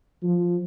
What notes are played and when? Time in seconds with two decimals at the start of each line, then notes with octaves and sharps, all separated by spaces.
0.22 F3